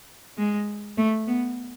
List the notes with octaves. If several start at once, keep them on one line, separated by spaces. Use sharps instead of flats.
G#3
A3
B3